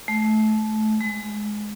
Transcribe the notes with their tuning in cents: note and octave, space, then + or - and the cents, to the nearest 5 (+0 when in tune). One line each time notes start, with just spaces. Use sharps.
A3 -25
G#3 +10